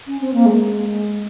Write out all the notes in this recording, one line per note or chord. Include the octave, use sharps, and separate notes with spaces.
C#4
C4
A#3
G#3